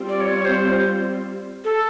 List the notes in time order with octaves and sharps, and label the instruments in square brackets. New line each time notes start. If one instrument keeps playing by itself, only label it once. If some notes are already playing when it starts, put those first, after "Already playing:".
Already playing: [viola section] G3 C4 F4
[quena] D5
C#5
C5
A4